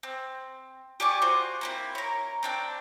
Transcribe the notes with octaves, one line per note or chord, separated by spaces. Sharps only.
C4
G4 D5 G#5 C#6
F4 F#4 C5
A#3 C4 E4
A#4 C#5
C4 D4 G5